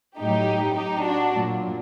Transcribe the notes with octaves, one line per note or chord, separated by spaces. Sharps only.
A2 F#3 D#4 G4
D#4 G4
D4 F#4
A#2 F#3